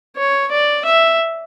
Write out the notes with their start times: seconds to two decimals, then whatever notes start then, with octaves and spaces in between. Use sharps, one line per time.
0.17 C#5
0.51 D5
0.85 E5